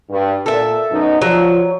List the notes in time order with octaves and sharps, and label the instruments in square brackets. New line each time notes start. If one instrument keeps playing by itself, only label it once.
[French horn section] G2
[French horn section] A#2 [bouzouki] A4 E5
[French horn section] F#2 B2 D#4
[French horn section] F3 [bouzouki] F#3